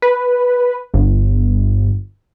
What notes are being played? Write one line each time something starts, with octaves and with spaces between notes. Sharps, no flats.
B4
G1